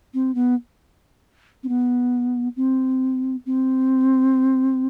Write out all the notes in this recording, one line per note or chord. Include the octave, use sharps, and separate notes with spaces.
C4
B3
C4
B3
C4
C4